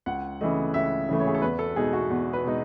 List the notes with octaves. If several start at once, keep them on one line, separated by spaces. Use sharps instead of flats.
C#2 F#5
C#3 E3 A3 D#5
C#2 E5
C#3 E3 A3
C#5
G#4
A4
E2 B4
A4
B2 G#3 D#4 G#4
F#4
E2
B4
B2 G#3 D#4